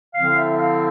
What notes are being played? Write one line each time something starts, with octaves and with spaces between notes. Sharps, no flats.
D3 F3 C4 E4 F5
E5
F5